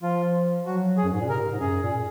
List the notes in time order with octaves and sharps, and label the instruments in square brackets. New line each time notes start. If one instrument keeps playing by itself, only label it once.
[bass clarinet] F3 [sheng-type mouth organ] F4
[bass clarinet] F#3 [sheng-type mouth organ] F#4
[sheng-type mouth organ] G#4
[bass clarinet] F#2
G#2
A#2
[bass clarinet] C3 [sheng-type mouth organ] A#4
[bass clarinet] G#2
[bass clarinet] F#2 [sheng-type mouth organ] G#4
[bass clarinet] A#2